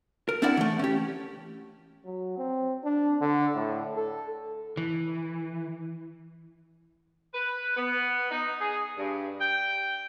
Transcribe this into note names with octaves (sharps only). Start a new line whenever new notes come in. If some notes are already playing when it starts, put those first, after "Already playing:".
A#4
C4 D4 E4 A#4 D5 F#5
E3 A3
C#4 G4
F#3
C4
D4
D3
A2
A4
E3
B4
B3
D#4
G#4
G2
G5